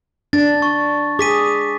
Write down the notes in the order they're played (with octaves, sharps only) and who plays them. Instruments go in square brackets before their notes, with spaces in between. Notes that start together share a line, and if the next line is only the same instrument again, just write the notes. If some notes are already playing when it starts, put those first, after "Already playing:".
[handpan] D4 [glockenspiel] A6
[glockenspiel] C#6
[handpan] G#4 [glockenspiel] D6 B6 D#7